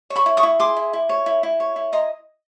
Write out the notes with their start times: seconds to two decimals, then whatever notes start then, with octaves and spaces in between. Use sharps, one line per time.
0.10 C#5
0.16 B5 C#6
0.26 E4
0.37 C#6 D#6
0.43 E4
0.60 G#4 C6 D6
0.76 E4
0.93 E4
1.09 C#5
1.26 E4
1.43 E4
1.60 C#5
1.76 E4
1.93 D#5 A#5 C6